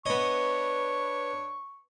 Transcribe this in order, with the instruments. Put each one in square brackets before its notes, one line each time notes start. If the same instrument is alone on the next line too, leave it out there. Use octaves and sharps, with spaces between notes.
[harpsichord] B3 D#5 [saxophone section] D4 B4 C#5 [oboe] C#6